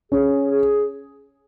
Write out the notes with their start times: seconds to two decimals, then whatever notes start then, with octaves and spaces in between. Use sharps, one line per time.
0.12 C#4 G#4
0.51 G#4